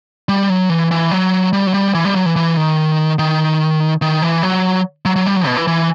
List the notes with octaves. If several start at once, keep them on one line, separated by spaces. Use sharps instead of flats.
G3
F#3
E3
E3
F#3
G3
F#3
G3
E3
G3
F#3
E3
E3
D#3
D#3
D#3
E3
F#3
F#3
F#3
G3
F#3
B2
E3
E3